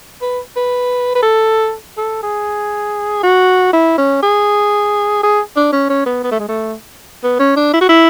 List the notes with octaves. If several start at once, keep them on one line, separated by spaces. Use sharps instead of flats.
B4
B4
B4
A4
A4
G#4
F#4
E4
C#4
G#4
G#4
D4
C#4
C#4
B3
B3
A3
G#3
A3
B3
C#4
D4
E4
F#4
E4